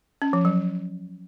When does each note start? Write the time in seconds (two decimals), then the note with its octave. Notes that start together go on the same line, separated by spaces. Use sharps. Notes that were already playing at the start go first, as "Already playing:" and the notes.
0.22 C#4
0.33 F3
0.45 F#3